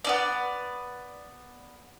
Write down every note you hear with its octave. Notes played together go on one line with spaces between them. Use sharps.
B3 C#4 D5